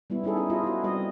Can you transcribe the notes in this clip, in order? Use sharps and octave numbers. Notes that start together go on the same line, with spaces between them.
G3 B3 E4
C#4 D#4 E4 G#4 A4
E4
E4 F4 D#5
E4 F#4
G3 C4 D#5